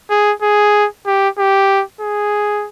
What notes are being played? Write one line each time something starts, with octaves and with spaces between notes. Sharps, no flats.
G#4
G#4
G4
G4
G#4